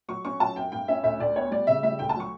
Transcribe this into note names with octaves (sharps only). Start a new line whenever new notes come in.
F#3 C#6
C#4 C#6
F#3 A5
F#2 G5
G2 G5
C#4 E5
D2 E5
D2 D5
B3 C#5
G3 D5
C#3 E5
G3 E5
D2 G5
A5
F#3 C#6